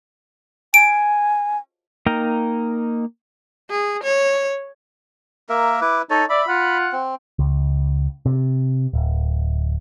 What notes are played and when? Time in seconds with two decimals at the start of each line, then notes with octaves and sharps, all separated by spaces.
0.74 G#5 D7
2.06 A#3 D#4 A#4 G5 A#5
3.70 G#4
4.03 C#5
5.49 A#3 A#4 E5
5.81 E4 B4 D6
6.10 D#4 A4 C#5 A5
6.30 D5 E5 B5
6.48 F4 F#5
6.92 C4
7.39 C#2
8.26 C3
8.93 D1